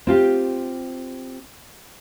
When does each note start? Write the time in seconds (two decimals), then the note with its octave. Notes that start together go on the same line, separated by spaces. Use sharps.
0.07 C4 F4 G4